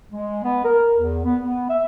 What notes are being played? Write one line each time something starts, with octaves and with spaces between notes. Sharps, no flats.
G#3
B3
A#4
E2
B3
B3
E5